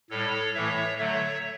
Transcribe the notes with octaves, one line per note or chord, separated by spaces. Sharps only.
A2 G3 A4 C#5
A2 E3 A3 C#5 E5
D3 F#3 A3 C#5 E5